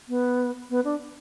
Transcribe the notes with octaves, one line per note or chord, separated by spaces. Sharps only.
B3
B3
D4